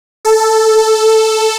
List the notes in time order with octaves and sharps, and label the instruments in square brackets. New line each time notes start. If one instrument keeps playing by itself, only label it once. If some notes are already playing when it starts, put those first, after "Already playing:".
[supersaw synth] A4